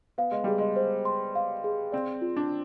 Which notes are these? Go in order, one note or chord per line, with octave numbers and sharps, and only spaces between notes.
B3 F5
G#3
G3 G#4
G#3
C5
C6
F5
G#4
C4 D5
F4
D4